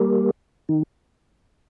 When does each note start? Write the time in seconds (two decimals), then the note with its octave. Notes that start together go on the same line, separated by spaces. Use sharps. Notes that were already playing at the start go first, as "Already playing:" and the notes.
Already playing: G3 A#3
0.69 D#3